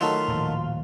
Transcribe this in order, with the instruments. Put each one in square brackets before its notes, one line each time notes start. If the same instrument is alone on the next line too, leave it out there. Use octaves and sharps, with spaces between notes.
[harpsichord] D#3 F#3 A3 [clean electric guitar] F4
[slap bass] D#1 A2 F3